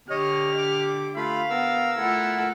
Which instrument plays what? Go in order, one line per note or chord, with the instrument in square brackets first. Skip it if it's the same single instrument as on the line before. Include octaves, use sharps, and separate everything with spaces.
[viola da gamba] D3 [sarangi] G4 [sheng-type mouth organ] C#5 D#5 [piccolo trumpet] F6
[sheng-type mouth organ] D6
[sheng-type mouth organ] A3 F4 B5 [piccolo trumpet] F5
[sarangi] B3 [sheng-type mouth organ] A#4 E6
[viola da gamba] A3 F4 A4 [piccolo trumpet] E4 [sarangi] F#5